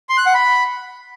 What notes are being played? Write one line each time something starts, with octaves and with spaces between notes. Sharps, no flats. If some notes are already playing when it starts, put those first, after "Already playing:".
C6
F#6
F#5
B5